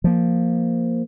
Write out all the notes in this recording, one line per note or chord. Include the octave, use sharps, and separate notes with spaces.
F3 A#3